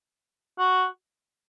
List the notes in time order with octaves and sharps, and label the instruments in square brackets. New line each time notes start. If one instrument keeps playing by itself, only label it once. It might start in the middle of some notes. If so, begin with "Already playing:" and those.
[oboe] F#4